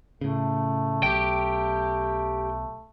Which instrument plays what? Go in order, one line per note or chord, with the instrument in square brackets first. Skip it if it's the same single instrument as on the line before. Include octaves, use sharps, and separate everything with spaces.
[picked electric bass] A2 C#3 [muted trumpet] A3
[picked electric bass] B1 [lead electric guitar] G4 G5